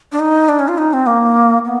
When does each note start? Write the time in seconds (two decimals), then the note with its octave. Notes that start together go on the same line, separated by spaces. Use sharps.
0.12 D4
0.20 D#4
0.49 D4
0.59 C#4
0.68 F4
0.78 D#4
0.93 C4
1.07 A#3
1.65 B3